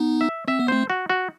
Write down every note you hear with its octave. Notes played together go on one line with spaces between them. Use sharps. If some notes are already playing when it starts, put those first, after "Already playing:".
Already playing: B3 D#4
E5
C4 E5
B3
A3 C4 C5
F#4
F#4